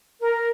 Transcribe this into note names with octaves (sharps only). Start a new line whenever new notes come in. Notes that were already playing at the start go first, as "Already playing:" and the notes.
A#4